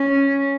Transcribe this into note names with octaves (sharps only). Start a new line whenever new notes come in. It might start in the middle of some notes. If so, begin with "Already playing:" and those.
Already playing: C#4